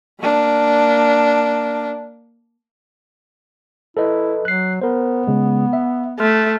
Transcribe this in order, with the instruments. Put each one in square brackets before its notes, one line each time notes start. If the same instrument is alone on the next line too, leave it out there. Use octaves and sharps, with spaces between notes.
[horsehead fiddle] A#3 D4
[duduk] E4 [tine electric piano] A4 B4 D#5
[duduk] F#3 [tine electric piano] F#6 C7
[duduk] B3 [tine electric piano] A#4 C5
[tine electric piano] C#3 G#3
E5
[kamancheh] A3 [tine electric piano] C6 F6